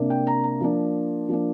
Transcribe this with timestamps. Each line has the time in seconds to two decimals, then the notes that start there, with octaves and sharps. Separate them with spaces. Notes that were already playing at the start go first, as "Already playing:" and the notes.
Already playing: C3 A#3 D4
0.10 G5
0.27 A#5
0.44 A#5
0.61 F3 A#3 D4
1.28 F3 A#3 D4